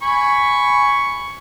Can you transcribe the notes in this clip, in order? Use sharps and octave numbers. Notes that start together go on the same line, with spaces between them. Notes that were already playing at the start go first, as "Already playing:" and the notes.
G#5 B5 C#6